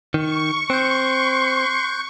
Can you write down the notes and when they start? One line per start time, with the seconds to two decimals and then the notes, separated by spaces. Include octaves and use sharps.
0.14 D#3 C#6
0.70 C4 C6 F#6 G6